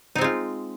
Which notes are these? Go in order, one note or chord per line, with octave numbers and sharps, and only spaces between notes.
G#3 C4 D#4 F4